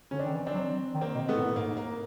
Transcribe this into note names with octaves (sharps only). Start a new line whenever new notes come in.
D3 C#4
C4 D4
D#3
E3
C4 D4
F#3
D#3
A#3 C4
B2
A3 B3
A2
G#2 A#3
A#3